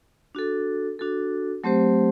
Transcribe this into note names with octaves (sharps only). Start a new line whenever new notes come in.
D4 F#4 A4
D4 F#4 A4
F#3 A3 C4 G4 C5